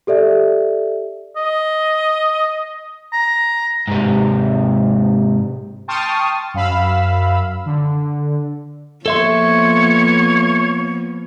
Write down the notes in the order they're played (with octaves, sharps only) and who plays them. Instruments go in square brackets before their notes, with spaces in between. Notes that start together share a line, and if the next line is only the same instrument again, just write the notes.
[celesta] G4 A4 D5 E5
[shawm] D#5
A#5
[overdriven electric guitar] G#2 C3
[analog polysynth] G5 A5 C6 C#6 D#6 F6
F#2 F5 B5 E6
D3
[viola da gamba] F3 A#3 B3 [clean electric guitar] A4 E5 C6 [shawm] C#5